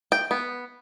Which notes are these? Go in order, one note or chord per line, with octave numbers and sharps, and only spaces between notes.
G5
B3